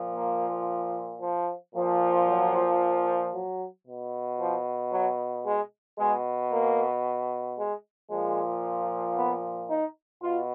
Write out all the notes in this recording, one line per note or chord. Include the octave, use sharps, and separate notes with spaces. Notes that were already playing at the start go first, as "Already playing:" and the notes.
Already playing: A#2 F3
A#3
F3
A#2 F3
F#3
F#3
B2
F3
F#3
G#3
B2 G#3
A#3
G#3
A#2 F3 G#3
B3
D#4
B2 F4